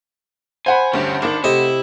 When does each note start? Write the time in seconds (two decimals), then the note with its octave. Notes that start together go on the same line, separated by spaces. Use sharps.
0.66 C5 F#5 G#5 B5
0.93 D2 G2 C#4 G4
1.22 G#1 D#3 D4
1.44 C3 A3 E4 D#5